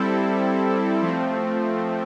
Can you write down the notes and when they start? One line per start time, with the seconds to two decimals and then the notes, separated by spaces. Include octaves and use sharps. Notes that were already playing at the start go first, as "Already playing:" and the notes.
Already playing: G3 C4 E4 A4
1.02 F3 A3 C4